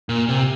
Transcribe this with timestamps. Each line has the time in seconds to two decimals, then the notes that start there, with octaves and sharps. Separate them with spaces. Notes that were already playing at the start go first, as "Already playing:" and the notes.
0.09 A#2
0.29 C3